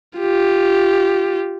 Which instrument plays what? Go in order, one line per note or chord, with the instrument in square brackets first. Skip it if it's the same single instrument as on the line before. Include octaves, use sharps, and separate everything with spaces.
[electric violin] F4 G4